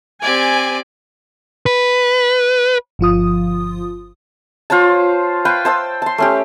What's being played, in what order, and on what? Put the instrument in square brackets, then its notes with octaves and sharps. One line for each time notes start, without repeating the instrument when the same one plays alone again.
[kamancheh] C4 G4 [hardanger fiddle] D5 [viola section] G#5
[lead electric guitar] B4
[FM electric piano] G1 F3 F4 D#6
[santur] F4 C5 C#5 A5
B4 F5 G5
C5 A5 E6
A5 C6
A3 C#4 G4